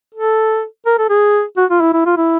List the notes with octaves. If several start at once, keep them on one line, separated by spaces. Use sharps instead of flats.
A4
A#4
A4
G#4
F#4
F4
E4
E4
F4
E4